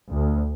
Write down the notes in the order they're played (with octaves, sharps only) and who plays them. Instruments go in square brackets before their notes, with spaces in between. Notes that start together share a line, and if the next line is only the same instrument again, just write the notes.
[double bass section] D2